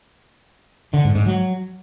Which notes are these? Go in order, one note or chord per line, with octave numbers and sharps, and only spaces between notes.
D3
G#2
G#2
F#3